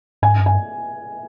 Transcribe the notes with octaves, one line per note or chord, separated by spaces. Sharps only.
G#2 G#5
G2
G#5